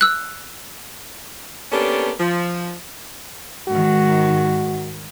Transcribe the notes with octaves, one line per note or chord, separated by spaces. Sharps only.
E6 F#6
A#3 B3 C#4 D4 G4 A4
F3
G#2 D#3 F#4